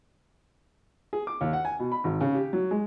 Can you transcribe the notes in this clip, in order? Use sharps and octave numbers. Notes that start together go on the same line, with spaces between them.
G#4
D6
D#2
F#5
G#5
B2
B5
G#1
C#3
G4
F#3
G#3